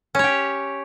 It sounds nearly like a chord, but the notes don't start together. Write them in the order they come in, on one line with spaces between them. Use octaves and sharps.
C#4 C#5 G4